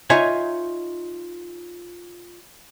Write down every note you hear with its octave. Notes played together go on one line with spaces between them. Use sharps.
D#4 F4 C#5 D#5 E5 G#5